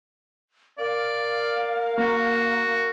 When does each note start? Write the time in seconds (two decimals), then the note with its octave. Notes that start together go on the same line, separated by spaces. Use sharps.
0.78 A#4 D5 F5
1.98 A#3 F#4